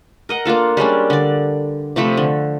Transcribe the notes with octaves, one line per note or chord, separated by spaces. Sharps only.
A#4 D#5 F#5
A#3 D4 F4 A4
G3 G#3 C#4 D4
D3 D5
C3 F3 A3 B5
D3